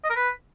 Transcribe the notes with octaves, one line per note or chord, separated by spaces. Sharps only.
D#5
A#4
B4